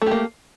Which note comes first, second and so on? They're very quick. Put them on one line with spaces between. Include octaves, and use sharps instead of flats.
A3 G4 A#3